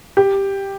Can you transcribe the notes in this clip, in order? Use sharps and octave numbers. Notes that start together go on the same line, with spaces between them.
G4